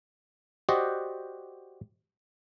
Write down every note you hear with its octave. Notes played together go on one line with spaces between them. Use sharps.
F#4 G4 C5 D5 D#5 F#5